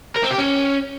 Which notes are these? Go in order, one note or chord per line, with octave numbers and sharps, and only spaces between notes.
A#4
C4
G4
C#4